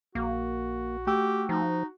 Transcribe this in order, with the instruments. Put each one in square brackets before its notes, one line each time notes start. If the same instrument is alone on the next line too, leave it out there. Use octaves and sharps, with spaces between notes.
[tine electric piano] A#1 [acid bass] A#3 [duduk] F#4
[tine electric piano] A3 G5 E6 [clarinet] G4
[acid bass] F3 [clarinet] D#4